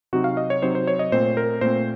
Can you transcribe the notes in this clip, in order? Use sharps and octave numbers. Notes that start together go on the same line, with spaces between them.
C3 F#3 C4 D#4 F#4
F5
D#5
C#5
C3 F#3 C4 D#4 C5
C5
C#5
D#5
A#2 A3 C4 C5
A#4
A#2 A3 C4 C5